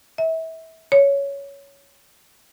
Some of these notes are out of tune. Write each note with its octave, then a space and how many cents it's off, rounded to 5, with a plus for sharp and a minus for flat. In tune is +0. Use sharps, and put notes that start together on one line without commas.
E5 -30
C#5 +10